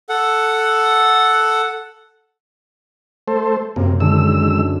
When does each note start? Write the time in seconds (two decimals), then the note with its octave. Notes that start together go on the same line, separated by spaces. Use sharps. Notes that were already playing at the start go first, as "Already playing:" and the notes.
0.09 A4 F#5
3.28 A3 A4 C5
3.76 F#2 C3 A#3
4.00 D3 D#3 G#3 E6